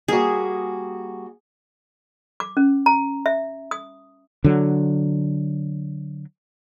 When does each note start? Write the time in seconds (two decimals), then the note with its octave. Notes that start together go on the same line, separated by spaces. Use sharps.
0.08 G3 A#3 F#4 G#4
2.40 D6
2.57 C#4
2.86 A#5
3.26 E5
3.71 D#6
4.44 D3 F#3